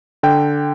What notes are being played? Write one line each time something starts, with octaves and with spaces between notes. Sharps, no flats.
D3 G5